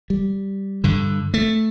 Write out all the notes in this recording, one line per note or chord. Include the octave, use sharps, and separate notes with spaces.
G3
G2 D3
A3